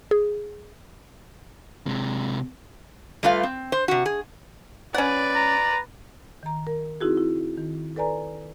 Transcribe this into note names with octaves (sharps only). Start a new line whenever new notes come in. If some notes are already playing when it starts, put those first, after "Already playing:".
G#4
C3 G#3
G3 A3 F4 B4 F5
C4
C5
C3 F#4
G#4
C#4 B4 D5 F#5
A#5
D#3 A#5
A#4
C4 D#4 E4 F#4 G#4
E4
D#3
A4 B4 D5 G#5 A#5